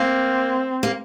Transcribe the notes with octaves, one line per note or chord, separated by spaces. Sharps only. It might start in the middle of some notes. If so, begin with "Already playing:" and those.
Already playing: A#3 C4
A#3